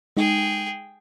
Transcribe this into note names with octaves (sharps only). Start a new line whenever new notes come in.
G#3 D#4 G#4 G5